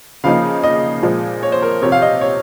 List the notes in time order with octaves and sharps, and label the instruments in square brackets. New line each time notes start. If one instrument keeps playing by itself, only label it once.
[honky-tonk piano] C#3 F3 A#3 D#4 [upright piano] F5
[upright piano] D#5
[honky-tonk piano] A#2 F3 G#3
[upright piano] C#5
C5
A#4
[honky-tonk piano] C3 F3 C4 [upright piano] C#5
[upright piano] F5
D#5
C#5